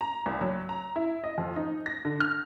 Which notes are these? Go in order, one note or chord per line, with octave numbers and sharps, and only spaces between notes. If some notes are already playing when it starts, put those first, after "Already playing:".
A#5
C2
F#3
A#5
E4
D#5
F2
D#4
A#6
D3
F6